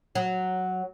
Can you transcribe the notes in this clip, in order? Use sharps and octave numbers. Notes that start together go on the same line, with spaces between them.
F#3